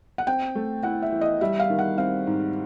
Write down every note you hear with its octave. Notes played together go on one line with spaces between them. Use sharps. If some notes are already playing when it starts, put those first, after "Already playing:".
F#5
C4 G5
A3
E4 F#5
E5
E3
D#5
G3 E5
F5
D#3
F#5
C4 F5
G#2